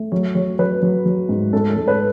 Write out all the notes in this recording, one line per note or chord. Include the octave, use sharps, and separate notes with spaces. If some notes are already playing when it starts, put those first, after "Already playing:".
Already playing: A3
F#3 C#5
F#3 C#5
F#3 B4
F#3
F#3
G#2
G#2 A4
A4
G#2
B4